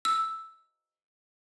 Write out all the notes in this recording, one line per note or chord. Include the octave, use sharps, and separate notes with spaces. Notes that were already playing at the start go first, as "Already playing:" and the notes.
E6